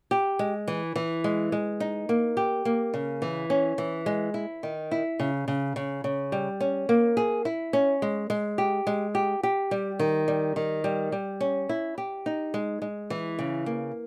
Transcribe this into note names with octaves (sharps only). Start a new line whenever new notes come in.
G4
G#3
E3
E3
G#3
G#3
D#4
A#3
G4
A#3
C#3
E3
C#4
E3
G#3
E4
D#3
E4
C#3
C#3
C#3
C#3
G3
C#4
A#3
G#4
E4
C#4
G#3
G#3
G4
G#3
G4
G4
G3
D#3
G3
D#3
G3
G3
C#4
E4
G4
D#4
G#3
G#3
E3
C#3
A#3